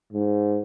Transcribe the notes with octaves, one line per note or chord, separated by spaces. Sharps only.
G#2